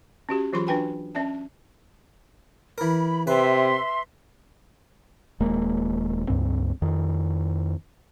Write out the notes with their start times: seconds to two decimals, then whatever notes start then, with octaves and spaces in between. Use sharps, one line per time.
0.29 C#4 F#4 G4
0.53 E3 F#3 F4 G#4 B5 C6
0.67 D4 F#4 B4 G5 G#5 B5
1.15 C#4 D5 E5 A5
2.78 E3 A#4 B5
3.27 C3 B4 E5 C6
5.40 D#1 G#3 A#3
6.28 C#2 G2 C4
6.82 F2 D#3